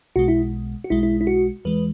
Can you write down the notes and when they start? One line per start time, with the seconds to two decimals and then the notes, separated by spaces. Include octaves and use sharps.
0.16 B1 B2 G#3 F#4
0.28 E4
0.84 F#4
0.90 B1 B2 G#3 E4
1.03 E4
1.21 E4
1.27 F#4
1.65 E2 E3 G#3 B4